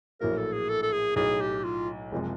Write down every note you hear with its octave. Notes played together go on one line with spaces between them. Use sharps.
A#1 A2 F#3 A#3 A#4
A4
G#4
A4
A4
G#4
B1 A2 F#3 G#4
G4
F4
F#1 C3 F3 G#3